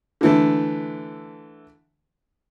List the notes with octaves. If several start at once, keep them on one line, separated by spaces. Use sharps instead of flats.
D3 E3 A3